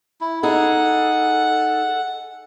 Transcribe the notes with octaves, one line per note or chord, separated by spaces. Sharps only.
E4
D#4 G#4 A4 F#5